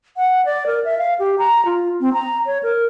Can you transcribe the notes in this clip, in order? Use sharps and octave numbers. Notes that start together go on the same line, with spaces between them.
F#5
D5
A#4
E5
F5
G4
A#5
F4
C4
A#5
C#5
A#4